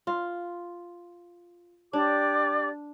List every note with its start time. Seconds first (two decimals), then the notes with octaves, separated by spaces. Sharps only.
0.07 F4
1.93 D4 G4 D5 D6